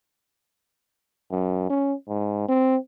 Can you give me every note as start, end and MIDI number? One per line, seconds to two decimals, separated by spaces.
1.31 1.66 42
1.70 1.94 61
2.08 2.45 44
2.48 2.77 60